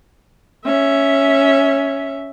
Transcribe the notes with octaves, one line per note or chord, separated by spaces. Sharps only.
C#4 E5